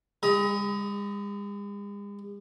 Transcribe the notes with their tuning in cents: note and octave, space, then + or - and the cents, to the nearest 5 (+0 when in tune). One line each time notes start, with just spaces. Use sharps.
G#3 -45 A#5 +30 D#6 +25